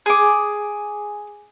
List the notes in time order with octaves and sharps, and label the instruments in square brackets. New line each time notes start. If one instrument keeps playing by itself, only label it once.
[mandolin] G#4 D6